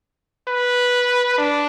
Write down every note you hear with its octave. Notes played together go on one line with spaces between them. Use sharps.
B4
D4